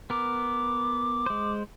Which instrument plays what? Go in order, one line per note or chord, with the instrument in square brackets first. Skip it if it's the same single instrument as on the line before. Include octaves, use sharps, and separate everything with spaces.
[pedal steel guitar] B3 A#4 [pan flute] D6
[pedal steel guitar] G#3 C5